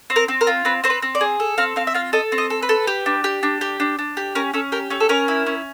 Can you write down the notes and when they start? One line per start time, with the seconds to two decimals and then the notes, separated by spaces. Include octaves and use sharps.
0.10 C4
0.16 A#4
0.28 C4
0.41 A#4
0.47 F4
0.65 C4 B4
0.84 C4 C5
0.90 B4
1.02 C4
1.15 D5
1.21 G#4
1.40 A4
1.58 C4 F5
1.76 C4 F5
1.87 E5
1.94 F4 F5
2.13 A4 D#5
2.32 C4
2.38 D#5
2.50 A4
2.62 B4
2.69 A4
2.87 G4
3.06 D4
3.24 G4
3.43 D4
3.61 G4
3.80 D4
3.99 D4
4.17 G4
4.35 C#4 A#4
4.54 C#4 A4
4.72 G4 A#4
4.90 C#4 A4
5.00 A4
5.09 C#4 A#4
5.28 E4
5.46 C#4